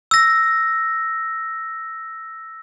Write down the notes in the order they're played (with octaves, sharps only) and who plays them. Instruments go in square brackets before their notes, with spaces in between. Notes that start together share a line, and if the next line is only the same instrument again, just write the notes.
[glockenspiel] E6 A#6